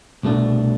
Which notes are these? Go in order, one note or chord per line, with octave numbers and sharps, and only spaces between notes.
C2 B2 A3 D4